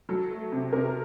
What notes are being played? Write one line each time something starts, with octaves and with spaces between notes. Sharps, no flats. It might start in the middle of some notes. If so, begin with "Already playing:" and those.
F#3 A4
A3
C3
C3 A#4